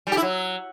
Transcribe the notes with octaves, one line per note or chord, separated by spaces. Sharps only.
G3
G4
E4
F#3